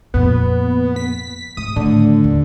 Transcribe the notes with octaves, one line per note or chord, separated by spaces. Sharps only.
F2 A#2 B3
B6
G#2 D#6
A2 D3 D#3
D#2